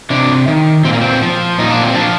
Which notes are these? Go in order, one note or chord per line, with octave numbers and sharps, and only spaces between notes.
C3 D4
D#3
A#2 C4
A#3
C4
F3
A#2 D#4
D4
C4
F3 D4